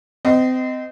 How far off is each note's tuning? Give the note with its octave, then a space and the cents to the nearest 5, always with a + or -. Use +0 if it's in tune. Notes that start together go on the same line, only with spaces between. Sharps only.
C4 -30 D#5 +0